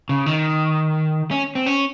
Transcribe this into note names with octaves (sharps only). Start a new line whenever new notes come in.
C#3
D#3
C#4
C4
C#4